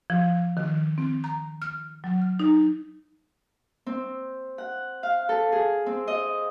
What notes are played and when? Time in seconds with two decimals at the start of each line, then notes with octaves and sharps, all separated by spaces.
0.10 F3
0.57 D#3
0.98 C4
1.24 A#5
1.62 F6
2.04 F#3
2.21 F6
2.39 D#4
3.86 C4
4.58 F#5
5.03 F5
5.29 A4
5.52 G#4
5.86 C4
6.07 D#5